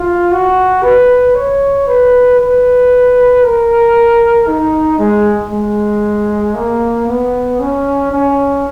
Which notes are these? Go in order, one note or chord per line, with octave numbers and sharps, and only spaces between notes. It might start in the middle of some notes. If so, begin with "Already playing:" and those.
Already playing: F4
F#4
B4
C#5
B4
B4
A#4
D#4
G#3
G#3
A#3
B3
C#4
C#4